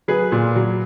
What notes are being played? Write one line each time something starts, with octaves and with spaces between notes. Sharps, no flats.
F#3 G#4 B4
A#2
F#3